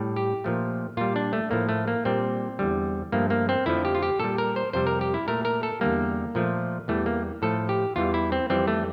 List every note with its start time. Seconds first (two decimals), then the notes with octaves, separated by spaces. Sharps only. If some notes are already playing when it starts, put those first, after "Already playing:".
Already playing: A2 G3
0.16 G4
0.44 A#2 F3 A3
0.97 A#2 G3 F4
1.16 D4
1.33 A3
1.51 A2 F3 A3 A#3
1.69 A3
1.88 A#3
2.05 A#2 G3 C4
2.59 E2 D3 G3
3.12 G2 F3 A3 A#3
3.30 A#3
3.49 C4
3.66 F2 D3 F3 A3 E4
3.85 G4
3.95 F4
4.03 G4
4.20 A#2 G3 A4
4.38 A#4
4.56 C5
4.73 F2 C3 G3 C5
4.87 A#4
5.01 G4
5.14 E4
5.28 A#2 A3 A#4
5.45 A#4
5.63 A4
5.81 E2 D3 G3 A#3
6.35 A#2 F3 A3
6.88 E2 E3 G3 A3
7.06 A#3
7.42 A2 F3 A3 A4
7.69 G4
7.96 E2 E3 G3 F4
8.14 E4
8.32 C4
8.50 F2 E3 G3 C4
8.67 A3